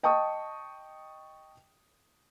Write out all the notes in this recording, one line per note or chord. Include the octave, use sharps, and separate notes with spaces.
D#5 G5 A5 C#6 D#6